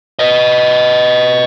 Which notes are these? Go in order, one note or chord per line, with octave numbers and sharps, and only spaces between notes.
B4 D#5